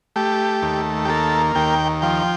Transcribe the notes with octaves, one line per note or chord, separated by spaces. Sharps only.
A3 G4
D#2
G4
A#3 A4
D#2 G5
F3 G5